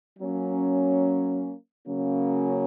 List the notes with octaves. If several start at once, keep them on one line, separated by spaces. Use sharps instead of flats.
F#3 A#3 C#4
C#3 F#3 A#3 C#4